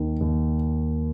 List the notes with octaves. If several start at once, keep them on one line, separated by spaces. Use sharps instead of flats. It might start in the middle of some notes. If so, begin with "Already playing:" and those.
Already playing: D#2 D#3
D#2